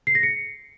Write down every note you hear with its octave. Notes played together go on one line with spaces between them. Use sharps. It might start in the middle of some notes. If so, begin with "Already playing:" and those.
C7
A#6
C#7